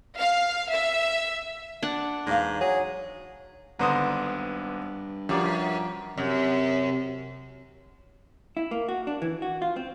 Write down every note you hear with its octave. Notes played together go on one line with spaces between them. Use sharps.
F5
E5
D4 D5 F#5
E2 G#2 F5
F#3 G#4
G#1 G2 D3 B3 C5 A#5 D#6
F#2 F3 G3 D5
F#2 C3
E4
A#3
F#4
D4
E3
F#4
F4
C4